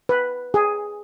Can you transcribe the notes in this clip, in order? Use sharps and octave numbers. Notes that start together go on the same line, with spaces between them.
B4
G#4